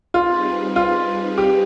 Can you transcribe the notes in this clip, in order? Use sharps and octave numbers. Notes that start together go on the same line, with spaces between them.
G3 C4 D#4 F4 G#4 B4
F4
G4